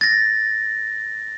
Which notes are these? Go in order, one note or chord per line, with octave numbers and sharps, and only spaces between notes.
A6 A#6